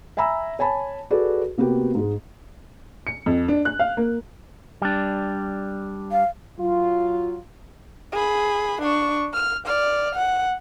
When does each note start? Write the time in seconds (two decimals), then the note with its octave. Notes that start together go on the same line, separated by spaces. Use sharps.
0.17 E5 G#5 A#5 B5 E6
0.59 C#5 G#5 A5 B5
1.10 F#4 G#4 A4 B4 D5
1.58 C3 A#3 B3 F#4 G4 B4
1.95 G#2 G#3
3.07 C#7
3.26 F2
3.48 D4
3.65 F#6
3.79 F5
3.97 A#3
4.82 G3 D4
6.12 F5
6.59 F#3 F4
8.12 G#4 B5
8.82 D4 C#6
9.33 F6
9.66 D5 F6
10.15 F#5